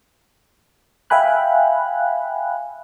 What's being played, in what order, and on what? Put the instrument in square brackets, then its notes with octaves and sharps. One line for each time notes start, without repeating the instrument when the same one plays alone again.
[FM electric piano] E5 F5 G5 G#5 B5 F#6